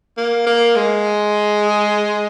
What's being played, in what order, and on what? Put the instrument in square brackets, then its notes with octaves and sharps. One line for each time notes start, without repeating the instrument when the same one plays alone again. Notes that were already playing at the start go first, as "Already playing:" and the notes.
[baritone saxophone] A#3
A#3
G#3
[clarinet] G#4